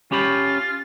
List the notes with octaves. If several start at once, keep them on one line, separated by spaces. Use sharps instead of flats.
C#4 F4 G4 B5